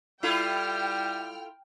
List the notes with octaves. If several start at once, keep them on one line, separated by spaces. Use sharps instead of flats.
G3 E4 F4 A4 G5 F6